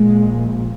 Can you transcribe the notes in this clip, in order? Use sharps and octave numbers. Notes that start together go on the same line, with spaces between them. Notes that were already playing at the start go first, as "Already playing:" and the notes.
Already playing: A#1 A#2 G#3